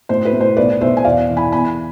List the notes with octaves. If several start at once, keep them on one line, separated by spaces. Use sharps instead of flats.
A2 C5
B4
A2
C5
B1 B4 D5
B1 C5 E5
G#5
E1 D5 F5
E3
G#5 B5
E2 G#5 B5